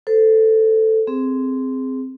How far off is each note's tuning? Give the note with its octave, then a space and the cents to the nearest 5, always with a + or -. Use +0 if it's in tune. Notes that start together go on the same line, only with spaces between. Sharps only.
A4 +0 C5 -20
C4 -10 G#4 +5